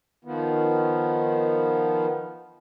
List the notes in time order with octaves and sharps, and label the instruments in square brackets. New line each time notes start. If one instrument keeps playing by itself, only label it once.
[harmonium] D#3 F3 B3